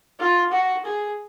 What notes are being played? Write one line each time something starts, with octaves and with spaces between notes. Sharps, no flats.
F4
F#4
G#4